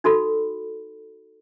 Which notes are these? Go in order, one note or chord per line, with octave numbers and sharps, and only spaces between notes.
D#4 F#4 A4 B5